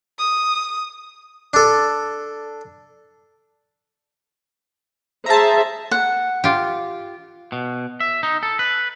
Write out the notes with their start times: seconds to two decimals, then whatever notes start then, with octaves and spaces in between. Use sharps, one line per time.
0.18 D#6
1.54 D4 A4
5.26 G#4 C5 E5 A5 A#5
5.91 F#5
6.44 F4 G4
7.52 B2
8.00 E5
8.23 D#4
8.43 A4
8.59 B4